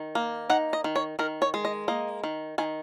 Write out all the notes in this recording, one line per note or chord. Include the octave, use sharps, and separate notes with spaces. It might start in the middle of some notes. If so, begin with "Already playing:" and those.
Already playing: D#3
A#3
D#4 F#5
D#5
D#3
C#5
D#3 A#4
C#5
G#3
D#5
A#3 D#5
D#3
D#3 G#5